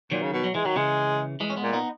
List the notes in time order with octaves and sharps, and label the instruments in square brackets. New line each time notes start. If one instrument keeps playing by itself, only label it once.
[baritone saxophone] A#2 [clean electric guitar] D#3 F#3
[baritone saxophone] C#3
B2
[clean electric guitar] F#3
[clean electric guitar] E3 [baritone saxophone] G#3
[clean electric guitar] D#3 [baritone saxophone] F#3
[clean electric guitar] C#3 E3 [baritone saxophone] G#3
[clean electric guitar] E3 G#3
C#4
G#3 B3
[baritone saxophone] A#2
[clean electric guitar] B3 D#4